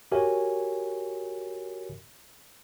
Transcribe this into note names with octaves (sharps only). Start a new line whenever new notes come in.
F#4 G4 A#4 C#5 E5 G#5